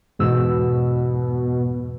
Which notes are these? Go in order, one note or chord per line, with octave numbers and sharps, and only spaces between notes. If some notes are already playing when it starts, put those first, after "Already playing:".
E2 G#2 B2 E6